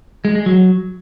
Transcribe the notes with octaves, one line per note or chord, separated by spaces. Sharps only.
G#3
G#3
F#3